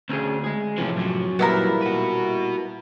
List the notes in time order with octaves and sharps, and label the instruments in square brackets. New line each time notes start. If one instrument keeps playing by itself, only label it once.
[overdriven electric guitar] D2 [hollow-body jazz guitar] C4 C#4 G#4
[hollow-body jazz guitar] G#3 G#4
[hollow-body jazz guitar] A2 C3 F3 [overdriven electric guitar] E3 C#4
[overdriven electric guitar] F#2 F#3
[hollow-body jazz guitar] A#2 G3 A#3 [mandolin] B3 E4 A#4
[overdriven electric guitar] F#4 B4